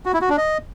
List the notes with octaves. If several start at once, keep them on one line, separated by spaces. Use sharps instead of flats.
F#4
E4
F#4
D4
D#5